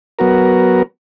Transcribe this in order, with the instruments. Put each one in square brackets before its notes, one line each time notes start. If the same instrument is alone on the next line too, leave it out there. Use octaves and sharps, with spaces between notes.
[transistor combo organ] F#3 B3 F#4 A#4